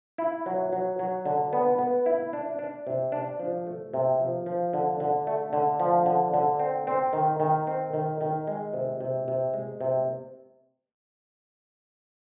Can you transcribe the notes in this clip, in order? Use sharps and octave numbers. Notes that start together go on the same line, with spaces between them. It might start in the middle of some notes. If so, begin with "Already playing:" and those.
E4
F#3
F#3
F#3
D3
B3
B3
E4
D4
D4
C3
D4
F3
A3
C3
F3
F3
D3
D3
A3
D3
F3
D3
D3
C4
C4
D#3
D#3
C4
D#3
D#3
G#3
C3
C3
C3
G#3
C3